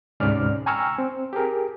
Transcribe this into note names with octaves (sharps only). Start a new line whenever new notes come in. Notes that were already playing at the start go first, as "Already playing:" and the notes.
D2 G#2 C3 C#4 D5 F6
G5 G#5 A#5 C#6 E6 F6
C4
G4 G#4 A#4